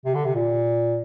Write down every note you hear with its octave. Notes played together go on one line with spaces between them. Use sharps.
C3
D3
C3
A#2